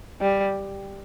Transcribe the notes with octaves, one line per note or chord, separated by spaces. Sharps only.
G3